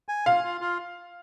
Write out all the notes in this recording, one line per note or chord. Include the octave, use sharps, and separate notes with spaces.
G#5
F4 F5
F4
F4